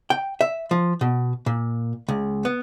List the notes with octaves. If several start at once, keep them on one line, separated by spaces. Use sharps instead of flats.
G5
E5
F3
B2
A#2
C#2
B3